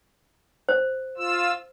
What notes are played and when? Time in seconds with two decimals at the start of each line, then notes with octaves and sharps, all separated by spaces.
0.69 C5
1.18 F4 E6